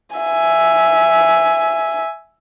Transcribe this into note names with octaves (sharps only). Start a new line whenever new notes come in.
E5 G#5